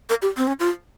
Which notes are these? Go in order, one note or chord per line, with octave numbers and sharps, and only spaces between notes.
A#4
G4
C4
C#4
F4